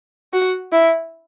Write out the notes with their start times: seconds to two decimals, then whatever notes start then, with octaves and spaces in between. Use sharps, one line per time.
0.33 F#4
0.72 E4